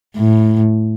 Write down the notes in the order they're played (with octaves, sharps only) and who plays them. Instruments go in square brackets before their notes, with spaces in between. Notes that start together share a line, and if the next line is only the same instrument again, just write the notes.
[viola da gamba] A2